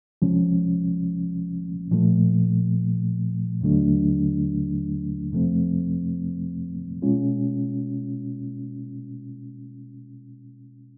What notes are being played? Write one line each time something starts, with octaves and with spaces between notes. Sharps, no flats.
C2 C3 F3 G#3 C#4
A#2 F3 A3
D#2 D3 F#3 A3 D4
F2 C3 F3 A3 C4
B2 G#3 C#4 F4